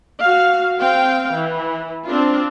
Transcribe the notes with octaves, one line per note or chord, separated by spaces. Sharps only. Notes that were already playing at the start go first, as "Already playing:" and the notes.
F#4 F5
C4 F5 G5
E3
C4 D4 F4